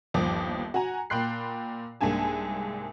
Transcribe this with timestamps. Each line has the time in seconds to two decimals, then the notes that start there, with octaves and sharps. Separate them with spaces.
0.14 G1 D#2 F3 D6 D#6
0.74 F#4 F#5 G#5 A#5
1.10 A#2 G5 B5 C6 F#6 C7
2.01 C2 G#2 A#3 D4 G#5 A5